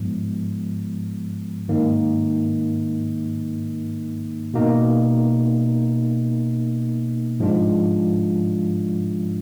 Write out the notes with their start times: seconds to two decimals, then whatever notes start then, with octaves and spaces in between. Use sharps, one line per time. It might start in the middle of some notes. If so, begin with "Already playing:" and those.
Already playing: G#2 F3 G#3 B3
1.68 G#2 D#3 A#3 D#4
4.54 B2 A#3 D#4
7.40 G#2 F3 G#3 D4 F4